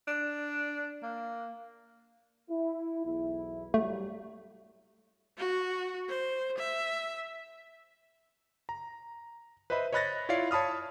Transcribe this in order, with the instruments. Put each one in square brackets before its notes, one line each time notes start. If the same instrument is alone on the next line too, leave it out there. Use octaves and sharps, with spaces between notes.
[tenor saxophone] D4
A#3
[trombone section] E4
B1 E2 E4
[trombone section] G2 F#3 G3 [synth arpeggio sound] A3
[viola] F#4
C5
E5
[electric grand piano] A#5
B4 C5 D#5 E5 B5
C#5 D#5 B5 F#6 A6 A#6
E4 F4 C#5 D5 F5 C7
C#5 A5 B5 D#6 F6